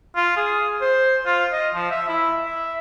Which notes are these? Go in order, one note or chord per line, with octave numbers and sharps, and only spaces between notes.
F4
G#4
C5
F4
D#5
F3
E5
E4
E5